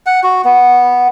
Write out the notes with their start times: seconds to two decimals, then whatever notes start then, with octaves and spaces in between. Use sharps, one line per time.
0.06 F#5
0.23 F#4
0.45 B3